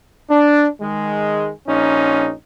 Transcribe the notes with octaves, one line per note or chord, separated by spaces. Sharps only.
D4
D#3 G#3
A#1 C#4 D#4